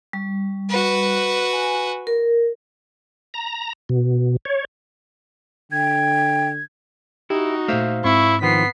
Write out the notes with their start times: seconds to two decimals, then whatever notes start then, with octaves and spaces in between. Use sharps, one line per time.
0.13 G3
0.69 F#4 B4
1.53 G#5
2.07 A#4
3.34 A#5
3.89 B2
4.45 C#5
5.72 D3 G5 G#6
7.30 D#4 E4 F#4 G4
7.68 A#2 A3 C5 E5 F5
8.04 G#2 C4 E4 C#6
8.42 D#3 F3 B3 B6 C7